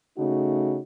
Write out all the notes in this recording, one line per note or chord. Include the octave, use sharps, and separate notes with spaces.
C#3 A3 D#4 F#4